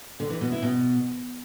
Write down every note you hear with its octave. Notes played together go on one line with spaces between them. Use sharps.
D3
E3
B2
E4
B2